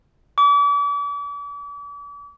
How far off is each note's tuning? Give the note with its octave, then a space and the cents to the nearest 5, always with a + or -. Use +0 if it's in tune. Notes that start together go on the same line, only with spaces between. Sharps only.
D6 -40